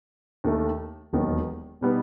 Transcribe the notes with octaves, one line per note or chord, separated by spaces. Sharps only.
D#2 D#3 A3
E1 D#2 D#3 F#3 B3
B2 G3 B3 D#4